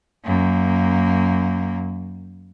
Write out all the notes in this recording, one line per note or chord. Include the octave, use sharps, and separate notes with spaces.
F#2 A#3